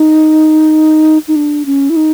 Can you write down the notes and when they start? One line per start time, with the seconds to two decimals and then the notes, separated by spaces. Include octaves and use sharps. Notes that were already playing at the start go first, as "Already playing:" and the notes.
Already playing: D#4
1.28 D#4
1.36 D4
1.66 C#4
1.90 E4
1.96 D#4